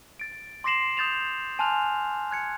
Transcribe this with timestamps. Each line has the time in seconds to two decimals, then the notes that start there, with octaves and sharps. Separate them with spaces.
0.20 A6 D7
0.64 C6 D6 A#6 C7 E7 F#7
0.97 D#6 G6 A6 E7 F7
1.59 G#5 A5 C6 F6 F#6 F7
2.31 F#6 G#6 C#7